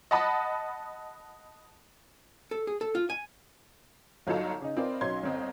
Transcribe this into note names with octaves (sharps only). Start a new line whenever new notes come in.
D#5 F#5 A5 B5 D#6
A4
G#4
A4
F4
G#5
G1 F#3 D#4 F4 A4 A#5
C#3 D#4
C4 F4 A#4 B4 D5 D#5
B1 F#3 C#4 D#4 C6 G#6
G1 C4 D#5